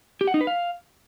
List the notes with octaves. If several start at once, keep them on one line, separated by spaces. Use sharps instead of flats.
G4
F#5
D#4
B4
F5